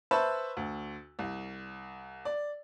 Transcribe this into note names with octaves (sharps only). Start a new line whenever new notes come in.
B4 C5 E5 A5 B5 C#6
D2
C2
D5